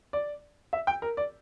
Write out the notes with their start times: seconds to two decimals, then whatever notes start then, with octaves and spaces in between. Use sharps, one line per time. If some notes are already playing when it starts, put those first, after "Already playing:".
0.13 D5
0.73 E5
0.87 G5
1.02 A#4
1.17 D5